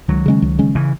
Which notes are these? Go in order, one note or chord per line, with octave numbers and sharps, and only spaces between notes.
C#2 D#3 F#3
C#3 G#3 C#4
C#2
C#3 G#3 C#4
C#3 E3